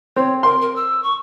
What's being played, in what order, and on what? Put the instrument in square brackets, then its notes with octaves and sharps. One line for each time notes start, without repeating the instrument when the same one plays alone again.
[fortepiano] C4 [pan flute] C#5
[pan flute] A#4 [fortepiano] C6
[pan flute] A#4
E6
C#6